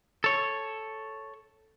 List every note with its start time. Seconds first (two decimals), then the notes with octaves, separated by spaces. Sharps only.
0.24 A4 C#5